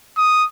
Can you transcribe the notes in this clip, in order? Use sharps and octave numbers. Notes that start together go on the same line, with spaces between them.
D#6